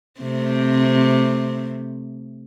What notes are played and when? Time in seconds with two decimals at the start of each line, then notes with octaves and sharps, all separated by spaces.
0.20 C3 A3 C4